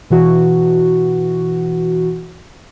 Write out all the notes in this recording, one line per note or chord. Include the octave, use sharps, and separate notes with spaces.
B2 E3 F#4